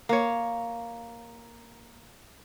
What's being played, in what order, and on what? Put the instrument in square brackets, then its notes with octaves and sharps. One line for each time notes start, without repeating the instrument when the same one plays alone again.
[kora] A#3 C#5